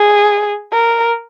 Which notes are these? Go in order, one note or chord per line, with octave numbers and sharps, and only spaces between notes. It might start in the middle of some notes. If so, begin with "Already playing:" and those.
Already playing: G#4
A#4